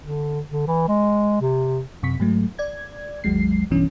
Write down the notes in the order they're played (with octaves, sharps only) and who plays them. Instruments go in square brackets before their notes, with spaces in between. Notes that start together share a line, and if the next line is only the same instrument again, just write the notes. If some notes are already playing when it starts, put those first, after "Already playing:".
[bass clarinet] D3
D3
E3
G#3
C3
[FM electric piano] F#2 C3 C#6 B6
G#2 F#3 A3
D5 G#6
G#1 D#2 F#3 G#3 C7
B1 G2 B2 E3 C#4 D4